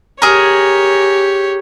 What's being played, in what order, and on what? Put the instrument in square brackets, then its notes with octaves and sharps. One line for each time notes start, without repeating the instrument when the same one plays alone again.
[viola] G4 C#5 [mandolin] G#4 A#4